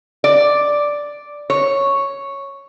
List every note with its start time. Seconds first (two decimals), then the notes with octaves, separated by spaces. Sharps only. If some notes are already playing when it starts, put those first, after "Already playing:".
0.24 D5
1.50 C#5